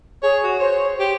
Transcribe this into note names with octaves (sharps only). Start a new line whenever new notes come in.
G#4 C#5
F#4
C5 C#5
G4